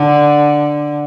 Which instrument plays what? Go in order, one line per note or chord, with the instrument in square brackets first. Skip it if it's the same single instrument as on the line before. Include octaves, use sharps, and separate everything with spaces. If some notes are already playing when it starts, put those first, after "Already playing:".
Already playing: [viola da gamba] D3